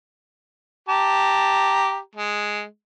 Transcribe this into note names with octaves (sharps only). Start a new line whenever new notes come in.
G4 A5 A#5
G#3